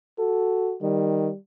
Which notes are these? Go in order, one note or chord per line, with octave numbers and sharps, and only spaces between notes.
F#4 A4
D#3 G3